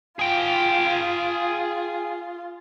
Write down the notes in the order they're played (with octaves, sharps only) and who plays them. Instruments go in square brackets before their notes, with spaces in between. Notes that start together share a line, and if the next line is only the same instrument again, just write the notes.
[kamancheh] F4 [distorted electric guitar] G#4 G5